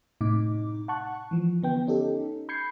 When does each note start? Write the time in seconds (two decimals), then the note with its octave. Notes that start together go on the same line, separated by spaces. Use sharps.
0.21 A2 C3 D#4 D6
0.88 F#5 A5 C#6 F#6
1.31 E3 F3
1.63 D3 B3 G5
1.87 C#4 D#4 G4 A4
2.49 B5 G6 G#6 C7 C#7